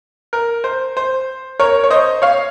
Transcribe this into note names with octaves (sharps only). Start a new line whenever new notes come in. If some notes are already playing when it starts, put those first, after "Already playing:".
A#4
C5
C5
A#4 C#5
C#5
C5 D#5
C#5 F5